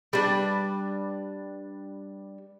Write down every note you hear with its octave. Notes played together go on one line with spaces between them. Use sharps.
G3 D4 B4